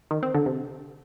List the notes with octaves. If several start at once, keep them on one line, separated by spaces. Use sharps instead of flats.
D#3
C4
D3
C3